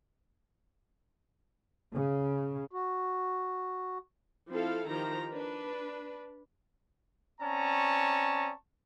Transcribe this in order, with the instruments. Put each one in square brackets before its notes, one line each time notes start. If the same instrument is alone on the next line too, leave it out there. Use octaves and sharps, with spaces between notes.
[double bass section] C#3
[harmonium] F#4
[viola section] F3 C4 E4 A4 F5
D#3 F3 G4 A#5
D4 B4
[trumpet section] C4 C#4 D5 A5 A#5 C#6